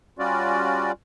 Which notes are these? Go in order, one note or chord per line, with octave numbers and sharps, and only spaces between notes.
G3 C#4 F4 F#4 D5